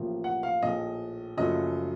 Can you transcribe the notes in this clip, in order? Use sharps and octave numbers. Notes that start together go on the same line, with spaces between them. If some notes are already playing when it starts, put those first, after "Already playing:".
Already playing: A1 A2 F3 A#3
F#5
F5
A#1 A2 A3 D#5
F#1 F#2 C#3 F3 A3 D#5